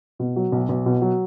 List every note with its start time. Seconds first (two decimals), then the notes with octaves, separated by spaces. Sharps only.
0.19 B2
0.36 F#3
0.52 B1
0.69 B1
0.86 B2
1.02 F#3